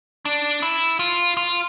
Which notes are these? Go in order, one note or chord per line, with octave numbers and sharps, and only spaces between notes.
D4
E4
F4
F4